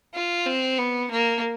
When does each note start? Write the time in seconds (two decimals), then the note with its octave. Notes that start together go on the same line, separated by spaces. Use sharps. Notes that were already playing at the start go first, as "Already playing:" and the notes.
0.14 F4
0.46 C4
0.78 B3
1.11 A#3